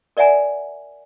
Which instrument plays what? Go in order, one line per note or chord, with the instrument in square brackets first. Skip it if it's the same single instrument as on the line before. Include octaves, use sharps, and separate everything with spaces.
[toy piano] A#4 D5 E5 F#5 G#5 A#5